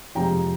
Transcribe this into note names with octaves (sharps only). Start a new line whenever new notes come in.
F2 C3 F3 G#3 G5 A#5